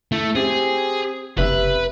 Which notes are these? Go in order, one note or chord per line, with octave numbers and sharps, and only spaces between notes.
A3 E4
C4 G4 G#4
F#1 C3 B4 E5 F#7